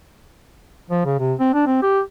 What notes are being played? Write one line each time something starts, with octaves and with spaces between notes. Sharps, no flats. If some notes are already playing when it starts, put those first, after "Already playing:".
F3
C#3
C3
C4
D4
C4
G4